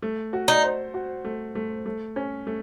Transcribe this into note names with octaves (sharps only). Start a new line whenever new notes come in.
A3
F#4
D#4
C5
F#4
A3
A3
A3
C#4
A3